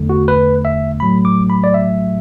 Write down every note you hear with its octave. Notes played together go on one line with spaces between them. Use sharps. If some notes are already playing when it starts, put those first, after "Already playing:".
Already playing: E2 D3 A3
F#4
B4
E5
A2 F#3 A3 B5
D6
B5
D5
E5